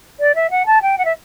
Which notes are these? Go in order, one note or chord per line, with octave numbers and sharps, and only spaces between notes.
D5
E5
F#5
A5
G5
F#5
E5